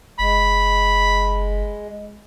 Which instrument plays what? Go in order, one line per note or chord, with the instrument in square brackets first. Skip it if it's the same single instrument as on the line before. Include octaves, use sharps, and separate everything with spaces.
[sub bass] F#1 [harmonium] G#3 [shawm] B5